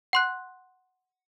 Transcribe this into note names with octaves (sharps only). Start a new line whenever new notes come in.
F#5 C6 F#6